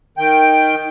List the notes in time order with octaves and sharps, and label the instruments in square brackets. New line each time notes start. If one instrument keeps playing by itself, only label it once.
[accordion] D#3 G5